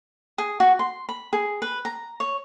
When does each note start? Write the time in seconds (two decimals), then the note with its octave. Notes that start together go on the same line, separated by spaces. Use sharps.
0.38 G#4
0.60 F#4
0.79 C6
1.09 B5
1.33 G#4
1.62 B4
1.85 A#5
2.20 C#5